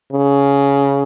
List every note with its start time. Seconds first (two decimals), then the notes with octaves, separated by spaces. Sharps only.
0.12 C#3